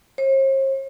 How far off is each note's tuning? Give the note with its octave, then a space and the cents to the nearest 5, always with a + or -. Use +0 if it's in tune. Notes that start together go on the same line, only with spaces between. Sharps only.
C5 +45